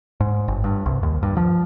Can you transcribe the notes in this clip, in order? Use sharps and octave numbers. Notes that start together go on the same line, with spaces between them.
G#2
G1
G2
C2
D#2
G2
F3